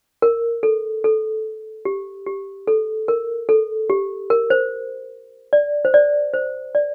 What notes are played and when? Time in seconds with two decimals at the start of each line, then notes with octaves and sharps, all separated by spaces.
0.22 A#4
0.63 A4
1.04 A4
1.85 G4
2.26 G4
2.67 A4
3.08 A#4
3.49 A4
3.90 G4
4.30 A#4
4.50 C5
5.53 D5
5.85 C5
5.94 D5
6.34 C5
6.75 D5